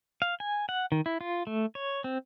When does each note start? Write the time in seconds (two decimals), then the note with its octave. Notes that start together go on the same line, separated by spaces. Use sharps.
0.22 F5
0.40 G#5
0.69 F#5
0.92 D#3
1.06 E4
1.21 F4
1.47 A3
1.75 C#5
2.04 C4